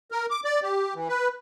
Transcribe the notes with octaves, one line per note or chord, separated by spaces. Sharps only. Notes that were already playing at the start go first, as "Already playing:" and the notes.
A#4
D6
D5
G4
E3
B4